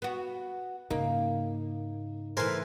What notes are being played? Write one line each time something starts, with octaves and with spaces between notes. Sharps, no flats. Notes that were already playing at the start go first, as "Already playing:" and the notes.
B3 F#4
G#2 C#3 A#3 D#4
E3 A3 A#4 C5 G#5